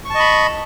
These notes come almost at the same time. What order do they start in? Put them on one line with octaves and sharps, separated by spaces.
C#6 A5 D#5 B5